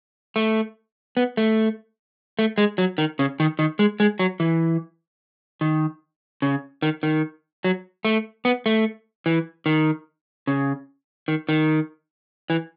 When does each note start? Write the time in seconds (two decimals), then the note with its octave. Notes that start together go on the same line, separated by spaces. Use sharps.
0.36 A3
1.17 B3
1.37 A3
2.39 A3
2.58 G#3
2.78 F#3
2.98 D#3
3.19 C#3
3.40 D#3
3.59 D#3
3.79 G#3
4.00 G#3
4.19 F#3
4.40 E3
5.61 D#3
6.42 C#3
6.82 D#3
7.03 D#3
7.64 F#3
8.05 A3
8.45 B3
8.66 A3
9.26 E3
9.66 D#3
10.47 C#3
11.28 D#3
11.49 D#3
12.50 E3